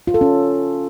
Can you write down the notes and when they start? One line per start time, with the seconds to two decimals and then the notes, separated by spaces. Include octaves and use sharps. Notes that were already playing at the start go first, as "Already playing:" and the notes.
0.07 F4
0.14 A4
0.21 C#4